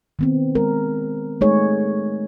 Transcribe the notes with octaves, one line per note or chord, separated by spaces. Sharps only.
D#3 B3 C4
G#3 A#4
G#3 A3 D#4 G#4 C#5